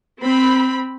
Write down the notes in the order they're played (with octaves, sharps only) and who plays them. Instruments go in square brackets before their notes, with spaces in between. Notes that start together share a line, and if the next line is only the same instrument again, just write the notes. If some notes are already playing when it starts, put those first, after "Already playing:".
[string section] C4 B5